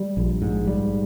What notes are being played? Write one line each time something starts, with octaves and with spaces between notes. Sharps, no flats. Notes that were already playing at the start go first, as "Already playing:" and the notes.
Already playing: G3
A#1
G#2
G3